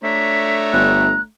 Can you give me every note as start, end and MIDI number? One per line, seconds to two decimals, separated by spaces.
0.04 1.28 57
0.04 1.20 62
0.04 1.20 73
0.04 1.20 82
0.04 0.57 95
0.72 1.15 31
0.72 1.21 90